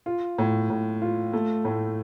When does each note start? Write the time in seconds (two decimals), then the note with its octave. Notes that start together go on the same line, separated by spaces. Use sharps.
0.06 F4
0.38 A2
0.70 A2
1.02 F4
1.33 A3
1.65 A2